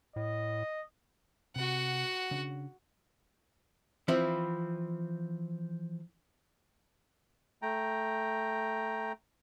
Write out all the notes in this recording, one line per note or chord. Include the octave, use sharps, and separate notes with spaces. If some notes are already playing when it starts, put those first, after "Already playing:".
A2 D#5
C3 F#4 F#5
C#3 D4
E3 F3 C4 E4
A3 G5 A#5